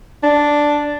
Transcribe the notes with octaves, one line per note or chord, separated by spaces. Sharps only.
D4